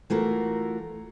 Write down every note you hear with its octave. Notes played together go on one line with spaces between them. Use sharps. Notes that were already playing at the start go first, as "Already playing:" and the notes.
E3 A3 F4 F#4 A#4